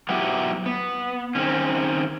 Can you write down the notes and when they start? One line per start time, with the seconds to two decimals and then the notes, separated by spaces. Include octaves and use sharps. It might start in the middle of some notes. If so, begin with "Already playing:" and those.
0.09 F#3 B3 E4 G4
0.66 B3
1.35 D#3 C4 C#4